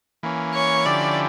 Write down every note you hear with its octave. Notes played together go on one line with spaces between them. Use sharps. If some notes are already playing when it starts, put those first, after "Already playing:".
E3 A#3 C#4
C#5
D3 F3 C#4 E4 G4 D5